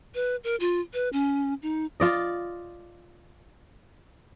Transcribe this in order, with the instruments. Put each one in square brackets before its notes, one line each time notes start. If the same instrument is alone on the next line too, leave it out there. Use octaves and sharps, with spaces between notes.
[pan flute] B4
A#4
F4
B4
C#4
D#4
[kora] F4 D5 D#5